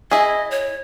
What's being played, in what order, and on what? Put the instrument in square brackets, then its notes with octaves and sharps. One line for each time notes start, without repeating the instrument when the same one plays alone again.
[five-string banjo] E4 G#4 [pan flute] D#5
[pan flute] C#5